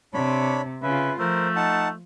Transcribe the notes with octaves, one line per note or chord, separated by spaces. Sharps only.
C3 D4 C#5 B5
C#3 F4 B4 E5
F3 A3 A#4 C5
D#4 F#5 A5